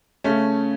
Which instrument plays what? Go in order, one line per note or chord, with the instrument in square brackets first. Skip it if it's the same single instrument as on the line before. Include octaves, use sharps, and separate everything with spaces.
[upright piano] C#3 A3 C#4